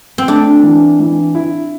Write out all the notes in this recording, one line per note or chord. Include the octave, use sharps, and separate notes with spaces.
C4
A3 D4
E3
E3
E4